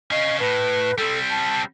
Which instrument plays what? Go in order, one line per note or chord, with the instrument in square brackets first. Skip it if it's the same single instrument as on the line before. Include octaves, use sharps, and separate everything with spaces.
[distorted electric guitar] C#4 F5 [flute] D#5
[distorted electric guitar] A2 [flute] B4
[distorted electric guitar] G3 C4 [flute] A4
[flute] A5